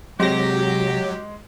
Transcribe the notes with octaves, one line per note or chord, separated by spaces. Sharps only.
C3 F#3 G#3 G4 A#6